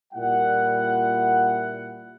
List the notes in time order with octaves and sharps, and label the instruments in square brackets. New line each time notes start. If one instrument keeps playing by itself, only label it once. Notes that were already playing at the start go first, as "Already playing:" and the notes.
[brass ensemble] A#2 G3 E4 F#5